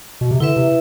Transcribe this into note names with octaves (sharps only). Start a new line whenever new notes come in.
B2
C3
D3 E4 B4 E5
C3